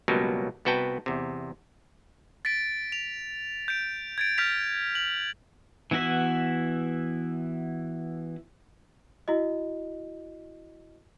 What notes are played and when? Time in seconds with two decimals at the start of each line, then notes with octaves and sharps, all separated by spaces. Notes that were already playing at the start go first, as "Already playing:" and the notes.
0.08 C#2 B2 F#3 G3 A#3
0.65 C2 B3 F#4 B4 G5 A5
1.06 E2 C3
2.45 A6 B6 D7
2.92 F7
3.68 G6 D7
4.18 G#6 A6 D7
4.38 F6 G6 A6 B6 F7
4.95 F#7
5.91 E3 B3 E4 F#4 E5
9.28 E4 F#4 D#5